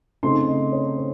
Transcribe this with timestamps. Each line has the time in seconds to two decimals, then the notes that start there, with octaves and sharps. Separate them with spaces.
0.23 C#3 A3 C4 D#4 C6
0.47 D#5
0.72 C#5
0.97 C5